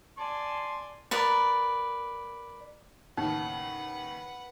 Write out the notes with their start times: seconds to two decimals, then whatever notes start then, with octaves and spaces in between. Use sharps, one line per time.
0.18 D5 G#5 A5 C6
1.11 A#4 B4 D5
3.17 D#2 A2 C#3 D#4 B4 F#5